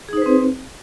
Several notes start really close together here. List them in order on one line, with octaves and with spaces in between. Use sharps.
G#4 D#4 C5 B4 C4